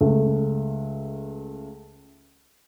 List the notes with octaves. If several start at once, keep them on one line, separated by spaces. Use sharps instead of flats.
C#2 A3